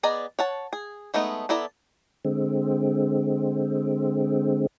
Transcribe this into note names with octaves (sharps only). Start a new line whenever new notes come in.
B3 G#4 D5 D#5 A#5
C#5 F#5 A5
G#4
G#3 A3 B3 D#4
B3 E4 A4 D5 A#5
D3 G#3 C4